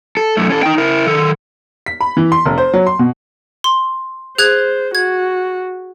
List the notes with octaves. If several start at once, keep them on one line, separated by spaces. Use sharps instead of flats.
A4
F#2 A3
C#4 A4
D#4 G5
E4 A#4
D#3 A4
B6
B5
E3
C6
F1
C5
F#3
C6
B2
C6
G#4 C5 F#6 G#6
F#4 G#6